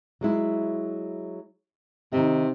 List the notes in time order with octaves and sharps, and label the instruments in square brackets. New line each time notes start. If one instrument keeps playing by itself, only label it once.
[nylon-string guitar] F#3 G#3 E4
[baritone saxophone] C3 [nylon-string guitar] D#3 D#5